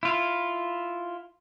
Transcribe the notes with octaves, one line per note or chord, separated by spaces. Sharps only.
E4 F4